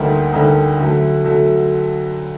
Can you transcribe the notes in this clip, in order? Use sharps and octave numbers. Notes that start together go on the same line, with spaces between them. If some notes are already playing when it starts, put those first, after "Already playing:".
Already playing: D2 D3 G3 A#3 D#4
D2 D3 G3 A#3 D#4
D3 F#3 A3
D3 F#3 A3